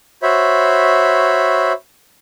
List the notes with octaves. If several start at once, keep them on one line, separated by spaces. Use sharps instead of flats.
F#4 C5 C#5 E5 B5